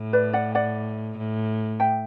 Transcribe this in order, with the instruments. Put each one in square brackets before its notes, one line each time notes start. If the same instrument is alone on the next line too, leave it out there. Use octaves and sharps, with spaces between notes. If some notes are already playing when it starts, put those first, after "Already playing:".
Already playing: [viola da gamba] A2
[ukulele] B4 D5
D5 F#5
D5 F#5
[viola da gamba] A2
[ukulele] E5 G5